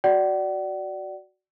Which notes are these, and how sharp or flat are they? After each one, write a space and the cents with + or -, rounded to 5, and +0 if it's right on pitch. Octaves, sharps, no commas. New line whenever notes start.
F#4 +0 D5 +0 F#5 +35